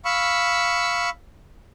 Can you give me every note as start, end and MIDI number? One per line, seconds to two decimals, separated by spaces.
0.05 1.10 77
0.05 1.10 83
0.05 1.10 85
0.05 1.10 88